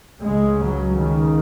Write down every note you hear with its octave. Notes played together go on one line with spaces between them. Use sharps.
C#2 C#3 G#3
F#3
D#3